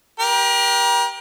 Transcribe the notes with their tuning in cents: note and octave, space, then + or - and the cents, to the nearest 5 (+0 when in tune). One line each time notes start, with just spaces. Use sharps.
G4 +5 A#4 +40